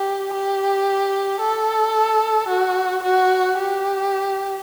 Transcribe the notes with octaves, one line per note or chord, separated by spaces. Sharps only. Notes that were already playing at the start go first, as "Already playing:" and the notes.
Already playing: G4
G4
A4
F#4
F#4
G4